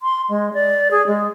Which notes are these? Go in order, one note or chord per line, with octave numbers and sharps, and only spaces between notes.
C6
G#3
D5
G#4
G#3